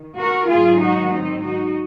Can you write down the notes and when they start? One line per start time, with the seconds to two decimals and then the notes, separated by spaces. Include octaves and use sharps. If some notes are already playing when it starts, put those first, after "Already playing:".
Already playing: D#3
0.19 F#4 A#4
0.50 G#2 D#3 F#3 F4 G#4
0.80 D#4 F#4
1.12 C4 D#4
1.42 D#4 F#4